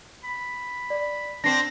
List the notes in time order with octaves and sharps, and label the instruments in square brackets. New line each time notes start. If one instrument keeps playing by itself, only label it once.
[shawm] B5
[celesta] D5
[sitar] C4 D4 [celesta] A#6 C7